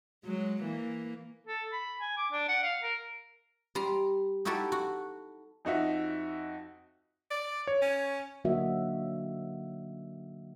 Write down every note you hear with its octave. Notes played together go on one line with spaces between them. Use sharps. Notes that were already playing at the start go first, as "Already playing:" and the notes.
F#3 G#3
E3 A#3
A4
B5
G#5
D6
D4
F#5
F5
A#4
G3 A#5 C6
D#4 E4 F#4 G4 A4
F#4
F2 D#4 F#4 E5
D5
C#5
C#4
D3 F#3 A#3 F#4 D#5 E5